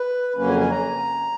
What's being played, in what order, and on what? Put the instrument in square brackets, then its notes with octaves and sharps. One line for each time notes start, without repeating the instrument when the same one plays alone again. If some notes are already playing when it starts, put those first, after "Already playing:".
Already playing: [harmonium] B4
F2 C#3 F#3 A#3 C#4 B4
G#5
G#5
A#5